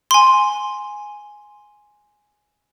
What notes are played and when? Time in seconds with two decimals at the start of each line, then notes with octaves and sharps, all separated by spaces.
0.11 G#5 C6